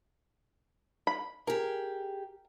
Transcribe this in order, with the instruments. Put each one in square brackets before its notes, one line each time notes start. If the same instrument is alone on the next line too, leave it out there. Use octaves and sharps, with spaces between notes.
[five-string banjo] B5
[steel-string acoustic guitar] G4 G#4 [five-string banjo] A#4